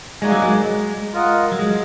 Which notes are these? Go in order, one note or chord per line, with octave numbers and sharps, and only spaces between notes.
G#3 A#3 D#4 F#4 D5 G#5
F#3
G#3
F4 A#4 D#5 F#5
F#3
G#3